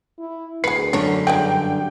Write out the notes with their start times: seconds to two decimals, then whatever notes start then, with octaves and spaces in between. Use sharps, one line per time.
0.19 E4
0.64 D2 G#4 B4 C7
0.93 F#2 D3 D4 F#4 C#5
1.27 G2 E3 F#3 G#3 G5